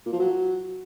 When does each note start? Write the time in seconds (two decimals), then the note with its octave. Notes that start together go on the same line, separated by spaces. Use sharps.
0.06 A#2
0.13 F3
0.19 F#3